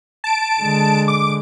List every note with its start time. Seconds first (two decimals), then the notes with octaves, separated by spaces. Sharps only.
0.24 A5 D7
0.61 D3 G#3
1.08 D6